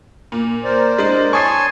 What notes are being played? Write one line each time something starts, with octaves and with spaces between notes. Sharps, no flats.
A#2
A#4 C5 D5
G#3 D4
C#5 G#5 A5 C6 C#6 D#6 C7